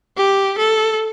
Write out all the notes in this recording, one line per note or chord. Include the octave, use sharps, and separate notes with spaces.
G4
A4